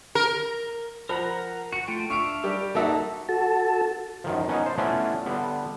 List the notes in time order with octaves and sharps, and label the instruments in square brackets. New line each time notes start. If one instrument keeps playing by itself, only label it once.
[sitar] A#4
[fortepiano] F3 C5 B5 [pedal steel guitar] A#4 F#5 A#5
[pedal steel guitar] F#4 [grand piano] C#7
[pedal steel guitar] A3 F4 G5
[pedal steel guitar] D4 E5 F5 [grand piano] C#6 D7
[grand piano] G3 G4
[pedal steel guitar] G3 D#4 [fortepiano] A#3 F#4 E5 [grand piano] A4
[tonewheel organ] F#4 A4 A5
[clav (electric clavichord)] F#2 D#3 F3
B3 C#4 D#4
C5 A5
A3 B3 C#4 D4 E4 F4
D3 G3 B3